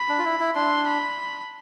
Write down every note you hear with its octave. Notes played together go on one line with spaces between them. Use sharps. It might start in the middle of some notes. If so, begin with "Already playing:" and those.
Already playing: B5
D4
F4
E4
E4
D4 C6
B5